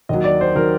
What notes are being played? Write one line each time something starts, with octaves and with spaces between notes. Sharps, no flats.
D#2 D#3 F#3 D#5
D5
C5
D#3 F#3 A#4